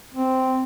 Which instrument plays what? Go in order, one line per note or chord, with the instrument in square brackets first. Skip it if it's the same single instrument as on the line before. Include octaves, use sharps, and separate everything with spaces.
[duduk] C4